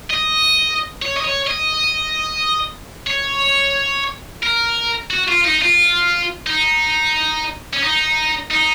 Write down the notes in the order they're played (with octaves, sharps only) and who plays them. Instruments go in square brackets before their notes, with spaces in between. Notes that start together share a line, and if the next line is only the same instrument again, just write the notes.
[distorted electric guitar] D#5
C#5
D#5
C#5
D#5
C#5
A#4
F#4
F4
D#4
F4
D#4
C#4
D#4
D#4